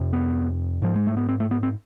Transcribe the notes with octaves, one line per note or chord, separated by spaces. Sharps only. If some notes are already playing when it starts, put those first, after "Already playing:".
Already playing: F2 C3
B3
G#2 F3
G#3
A3
B3
C4
A3
B3
C4